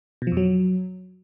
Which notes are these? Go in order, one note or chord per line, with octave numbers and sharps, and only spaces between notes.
B2
F3
F2
F#3